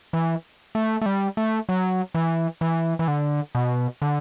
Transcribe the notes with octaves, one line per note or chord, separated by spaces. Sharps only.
E3
A3
A3
G3
A3
F#3
E3
E3
E3
D3
B2
D3